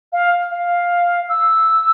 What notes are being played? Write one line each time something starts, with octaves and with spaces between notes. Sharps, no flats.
F5
F5
E6